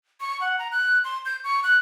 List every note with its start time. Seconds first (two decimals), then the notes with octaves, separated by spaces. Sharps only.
0.21 C#6
0.41 F#5
0.59 A#5
0.72 F#6
1.04 C6
1.25 G6
1.44 C#6
1.64 F#6